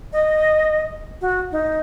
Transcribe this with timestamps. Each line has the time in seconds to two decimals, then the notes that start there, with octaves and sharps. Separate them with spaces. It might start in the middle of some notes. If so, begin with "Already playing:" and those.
0.13 D#5
1.22 F#4
1.52 D#4